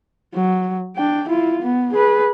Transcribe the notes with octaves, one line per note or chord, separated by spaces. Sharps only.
F#3
D4 G5
E4 F4
B3
G#4 B4